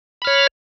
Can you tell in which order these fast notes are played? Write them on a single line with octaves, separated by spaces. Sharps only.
B5 F6 C#5